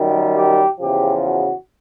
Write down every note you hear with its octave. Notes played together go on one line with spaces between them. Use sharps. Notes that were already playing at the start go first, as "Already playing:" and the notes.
Already playing: F#2 D#3 G3
G4
E2 C#3 F3 G4
F#4